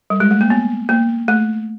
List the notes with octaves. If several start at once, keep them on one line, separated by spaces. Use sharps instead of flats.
G3
G#3
A3
A#3
B3
A#3
A3